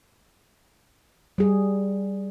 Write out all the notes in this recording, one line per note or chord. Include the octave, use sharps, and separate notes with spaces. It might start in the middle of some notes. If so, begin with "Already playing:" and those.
G3 G#4